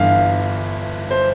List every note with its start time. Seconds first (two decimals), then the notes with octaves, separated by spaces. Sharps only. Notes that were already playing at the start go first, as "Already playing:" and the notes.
Already playing: G1 G2 E3 F5
1.11 C5